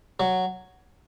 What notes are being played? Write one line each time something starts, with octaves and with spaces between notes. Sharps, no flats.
F#3